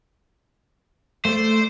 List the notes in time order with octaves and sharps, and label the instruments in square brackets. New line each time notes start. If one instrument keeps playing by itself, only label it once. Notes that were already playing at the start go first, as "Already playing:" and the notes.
[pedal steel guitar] A3 D5 [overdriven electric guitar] C5